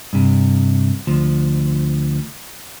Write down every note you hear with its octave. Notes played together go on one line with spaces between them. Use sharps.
G2 C3
D2 F3